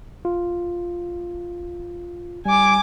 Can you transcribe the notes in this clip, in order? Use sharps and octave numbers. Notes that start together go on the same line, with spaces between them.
F4
G3 G#5 D6